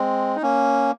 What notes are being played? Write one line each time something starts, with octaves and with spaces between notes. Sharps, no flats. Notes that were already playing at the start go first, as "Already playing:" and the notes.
Already playing: G#3 C4
D#4
A#3 C#4